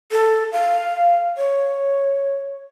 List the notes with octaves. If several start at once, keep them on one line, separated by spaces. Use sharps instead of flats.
A4
F5
C#5